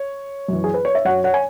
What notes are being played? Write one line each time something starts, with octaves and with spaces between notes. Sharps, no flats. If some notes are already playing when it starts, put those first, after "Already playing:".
Already playing: C#5
F#2 E3
G#4
B4
C#5
E5
F#2 F#3 C#5 F#5
C#5 F#5
G#5